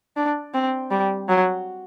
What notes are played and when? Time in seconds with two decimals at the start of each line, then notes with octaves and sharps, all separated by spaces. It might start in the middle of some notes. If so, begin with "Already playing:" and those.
0.17 D4
0.54 C4
0.91 G3
1.29 F#3